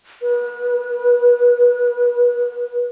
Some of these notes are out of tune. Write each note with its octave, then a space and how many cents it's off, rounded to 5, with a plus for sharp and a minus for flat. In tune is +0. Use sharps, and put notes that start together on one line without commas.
B4 -35